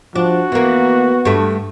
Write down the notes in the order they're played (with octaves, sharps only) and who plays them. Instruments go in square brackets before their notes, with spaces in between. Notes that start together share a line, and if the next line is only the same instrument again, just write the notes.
[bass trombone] F3 [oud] D4 [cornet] F#4
[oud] E3 A#3 [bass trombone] B3
[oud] G2 A3